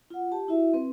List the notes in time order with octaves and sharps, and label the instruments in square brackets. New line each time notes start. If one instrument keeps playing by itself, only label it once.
[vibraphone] F4 F#5
G4 A5
E4 F#4 E5
C4 B4